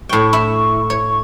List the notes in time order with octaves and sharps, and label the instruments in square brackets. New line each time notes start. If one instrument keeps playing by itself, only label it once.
[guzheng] A2 G5 [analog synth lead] C#6
[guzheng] E4
C#5